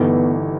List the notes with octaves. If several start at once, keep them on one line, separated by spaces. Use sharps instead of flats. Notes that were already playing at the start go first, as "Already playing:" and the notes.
Already playing: G1 G2 E3 A3 B3 D#4